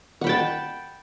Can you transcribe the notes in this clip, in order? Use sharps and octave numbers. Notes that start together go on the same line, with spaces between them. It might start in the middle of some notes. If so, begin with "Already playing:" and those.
F#5 G5 A5 B5